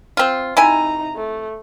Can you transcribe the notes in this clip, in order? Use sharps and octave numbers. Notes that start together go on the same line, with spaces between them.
C4 F4
C3 D#4 E4 G#5 A#5
A3